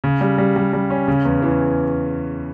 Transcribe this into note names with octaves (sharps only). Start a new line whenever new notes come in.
C#3
G3
G3
G3
G3
C#4
C#3
E2
E3